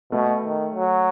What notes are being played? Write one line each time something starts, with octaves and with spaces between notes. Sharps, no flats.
B2 A3
D#3
F#3